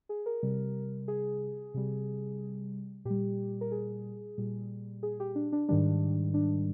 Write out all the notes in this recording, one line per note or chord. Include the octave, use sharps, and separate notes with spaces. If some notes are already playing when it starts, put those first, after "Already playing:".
G#4
A#4
C3 G3
G#4
C3 G3
A#2 G3 G4
A#4
G#4
A#2 G3
G#4
G4
D4
D4
G#2 D#3 G3 D4
D4